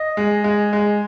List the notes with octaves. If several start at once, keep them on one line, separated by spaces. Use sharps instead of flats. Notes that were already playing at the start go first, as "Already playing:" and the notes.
Already playing: D#5
G#3
G#3
G#3